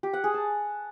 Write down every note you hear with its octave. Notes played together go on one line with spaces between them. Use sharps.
G4
F#5
G#4
A5